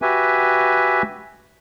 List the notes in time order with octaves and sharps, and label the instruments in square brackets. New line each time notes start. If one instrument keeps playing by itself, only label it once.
[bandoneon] F#4 G4 B4 E5 G#5